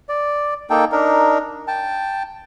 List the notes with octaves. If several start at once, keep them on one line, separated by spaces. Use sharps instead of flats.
D5
A#3 D#4 A4 G5
D4 D#4 A#4
G5 A5